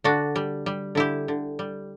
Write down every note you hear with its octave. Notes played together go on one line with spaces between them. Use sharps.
D3 D4 F#4
G3
G3
D3 E4 G4
D3
G3